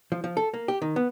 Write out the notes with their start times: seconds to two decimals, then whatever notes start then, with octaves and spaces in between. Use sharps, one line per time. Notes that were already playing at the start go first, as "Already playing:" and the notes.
0.12 F3
0.24 F3
0.37 A4
0.54 A#3
0.68 G4
0.82 D#3
0.96 B3